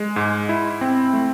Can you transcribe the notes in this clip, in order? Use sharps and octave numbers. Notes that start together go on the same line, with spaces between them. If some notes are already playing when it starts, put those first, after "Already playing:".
Already playing: G#3
G#2
E4
C4
A3